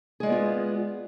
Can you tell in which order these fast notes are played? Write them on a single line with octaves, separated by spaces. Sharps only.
G#4 G#3 D5 B3 F4